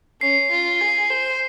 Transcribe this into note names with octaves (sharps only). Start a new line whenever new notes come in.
C#4 C7
F4
G#4
C5